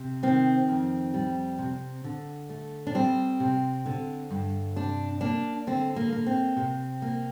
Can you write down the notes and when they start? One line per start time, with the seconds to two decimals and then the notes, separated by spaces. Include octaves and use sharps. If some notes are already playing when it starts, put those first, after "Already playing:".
Already playing: C3
0.23 D#3 C4
0.68 F2
1.14 G3
1.58 C3
2.04 D3
2.50 A3
2.87 D4
2.95 G3 C4
3.40 C3
3.86 D3
4.31 G2
4.76 C3 D4
5.21 A#3 D4
5.67 D3 C4
5.96 A#3
6.12 A#3
6.26 C4
6.57 C3
7.02 A#3